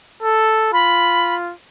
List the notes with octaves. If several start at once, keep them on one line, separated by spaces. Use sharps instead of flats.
A4
F4 B5